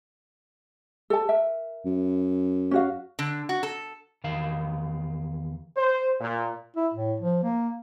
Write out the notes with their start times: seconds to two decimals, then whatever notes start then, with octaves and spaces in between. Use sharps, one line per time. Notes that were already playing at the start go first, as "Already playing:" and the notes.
1.10 A4 A5
1.29 A#4 E5
1.85 F#2
2.71 C#4 F#4 F5
3.19 D3
3.49 F#4
3.63 A4
4.24 E2 D#3 F5
5.77 C5
6.20 A#2
6.77 E4
6.94 A2
7.20 F3
7.44 A#3